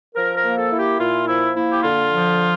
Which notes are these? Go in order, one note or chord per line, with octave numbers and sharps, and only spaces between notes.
F3 A#4
A#4
A#3
A4
E4
G4
A#2 F4
F3 E4
A#3 E4
G4
D3 F4
F3